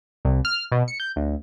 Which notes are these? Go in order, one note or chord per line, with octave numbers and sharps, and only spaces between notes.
C2
F6
B2
C#7
G6
D2